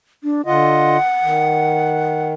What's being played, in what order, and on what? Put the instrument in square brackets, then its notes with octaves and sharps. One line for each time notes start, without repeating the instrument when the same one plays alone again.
[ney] D4
[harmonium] D3 F4 D#5 [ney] F#5
[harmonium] D#3